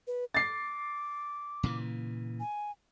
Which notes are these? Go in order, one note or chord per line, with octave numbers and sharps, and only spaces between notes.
B4
D6 A6 C7
A#2 C#3 E3
G#5